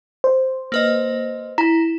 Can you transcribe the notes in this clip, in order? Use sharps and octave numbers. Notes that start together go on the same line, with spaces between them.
C5
A#3 B4 D#5
E4 A#5